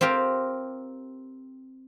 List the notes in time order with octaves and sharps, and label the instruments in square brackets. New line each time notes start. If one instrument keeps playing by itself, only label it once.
[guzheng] C4 F4 G4 A#4